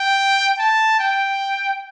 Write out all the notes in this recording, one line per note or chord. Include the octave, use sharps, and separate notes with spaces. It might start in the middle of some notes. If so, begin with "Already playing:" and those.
Already playing: G5
A5
G5